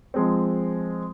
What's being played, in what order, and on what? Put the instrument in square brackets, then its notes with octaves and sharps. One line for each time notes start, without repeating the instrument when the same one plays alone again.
[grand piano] F3 G#3 C4